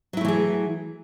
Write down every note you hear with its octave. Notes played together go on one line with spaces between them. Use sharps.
E3 F#3 A3 E4 G#4